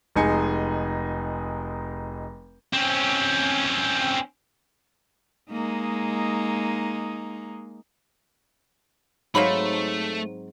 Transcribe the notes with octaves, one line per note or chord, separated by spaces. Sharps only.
F1 G#3 D#4 G#5 C#7
C4 C#4
G#3 A#3 D#4
G#2 F#3 A3 A#3 C4 D#4 B5